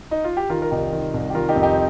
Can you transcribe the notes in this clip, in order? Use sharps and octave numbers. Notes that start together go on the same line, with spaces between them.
D#4
F4
G4
D#3 F4 A#4
A#4
C2 D#4 G4
D#3
C2
G4
D#3 F4 A#4
D#4 G4
F2
D#4 G4